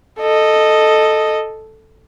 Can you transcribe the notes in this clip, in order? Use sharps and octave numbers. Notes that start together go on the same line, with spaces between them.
A4 D#5